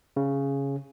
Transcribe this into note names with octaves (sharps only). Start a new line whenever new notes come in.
C#3